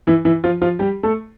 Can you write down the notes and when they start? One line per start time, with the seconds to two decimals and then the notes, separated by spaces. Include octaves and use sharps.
0.07 E3 E4
0.25 E3 E4
0.44 F3 F4
0.61 F3 F4
0.79 G3 G4
1.03 A3 A4